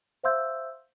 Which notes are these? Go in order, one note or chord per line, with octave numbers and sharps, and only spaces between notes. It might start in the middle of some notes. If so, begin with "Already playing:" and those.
C5 E5 F5 C6 E6 G6